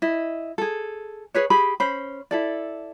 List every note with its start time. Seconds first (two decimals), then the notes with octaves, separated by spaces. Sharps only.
0.02 E4 D#5
0.58 G#4 A4
1.34 G#4 B4 C#5
1.50 G4 G#4 B5
1.80 C#4 C5 B5
2.31 E4 A4 D5